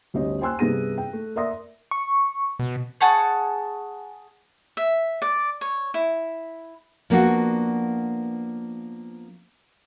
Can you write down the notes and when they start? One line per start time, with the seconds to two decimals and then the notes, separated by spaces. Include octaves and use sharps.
0.14 G1 D2 C#4 G4 C#5 D#5
0.41 C5 G5 G#5 C6 E6 F#6
0.59 G2 C3 B3 G#4 A#6 D#7
0.98 G5
1.13 A3
1.36 A#4 D5 E5 C6 D#6 A#6
1.91 C#6
2.59 B2
3.01 G#4 F#5 A5 C#6
4.77 E5
5.22 D5
5.61 C#5
5.94 E4
7.10 F3 A#3 B3 D4 F#4